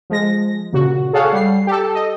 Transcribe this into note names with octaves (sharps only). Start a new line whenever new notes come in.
F3 G#3 A#6
A#2 C#3 F#4
G#4 A4 C#5 F5 F#5
G3 C7
G4 A4
D#5